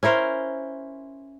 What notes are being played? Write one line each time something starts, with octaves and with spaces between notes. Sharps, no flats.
C#4 E4 A#4 C5